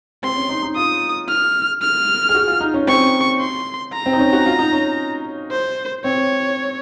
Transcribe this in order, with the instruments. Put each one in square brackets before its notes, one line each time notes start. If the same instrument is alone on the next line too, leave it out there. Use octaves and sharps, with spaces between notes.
[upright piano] C4 [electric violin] C6
[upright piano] C#4
D#4
D#4
[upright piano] F4 [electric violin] D#6
[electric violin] F6
F6
[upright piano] G#4
F#4
F4
D#4
C#4
[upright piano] C4 [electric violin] C#6
[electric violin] C6
A#5
[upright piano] C4
D#4
C#4
F#4
F4
D#4
C#4
[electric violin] C5
[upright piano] C4 [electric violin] C#5